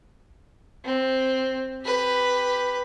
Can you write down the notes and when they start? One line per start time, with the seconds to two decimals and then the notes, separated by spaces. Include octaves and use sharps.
0.84 C4
1.83 G4 B4